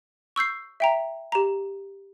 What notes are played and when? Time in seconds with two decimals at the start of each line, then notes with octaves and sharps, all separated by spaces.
0.36 C#6 E6 G6 C7
0.80 E5 G5 A#5
1.32 G4 A#5